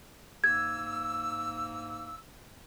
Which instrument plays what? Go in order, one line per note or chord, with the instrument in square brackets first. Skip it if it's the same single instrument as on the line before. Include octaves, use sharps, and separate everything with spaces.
[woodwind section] G#2 A#3 E6 [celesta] G#6